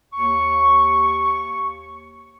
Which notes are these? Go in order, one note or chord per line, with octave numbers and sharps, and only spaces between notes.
D#2 C#6